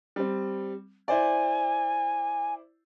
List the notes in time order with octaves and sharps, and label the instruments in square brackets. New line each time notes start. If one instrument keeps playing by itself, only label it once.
[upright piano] G3 C4
[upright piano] E4 C5 D5 [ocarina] G#5